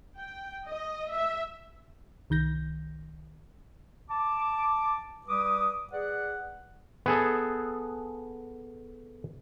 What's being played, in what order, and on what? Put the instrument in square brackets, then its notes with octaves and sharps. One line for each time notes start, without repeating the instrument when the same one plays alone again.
[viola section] G5
D#5
E5
[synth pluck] C2 D#3 G6 A#6
[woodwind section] A5 D6
G3 B4 D6 D#6
G#4 B4 D5 F#5
[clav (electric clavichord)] B3 G#4 A4